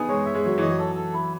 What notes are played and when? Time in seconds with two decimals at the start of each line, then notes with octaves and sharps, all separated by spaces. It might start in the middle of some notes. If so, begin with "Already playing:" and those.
Already playing: B3 D#4 G#4
0.09 G#3 C#5
0.26 E5
0.35 G#3
0.44 F#3 C#5
0.58 E3 D#5
0.69 F#3
0.79 A4
0.95 A4
1.14 E4